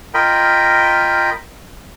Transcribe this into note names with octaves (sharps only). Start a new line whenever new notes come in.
F4 A#4 D#5 G5 B5